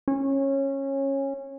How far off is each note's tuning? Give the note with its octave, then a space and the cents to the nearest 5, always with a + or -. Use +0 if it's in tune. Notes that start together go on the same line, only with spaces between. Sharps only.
C#4 -20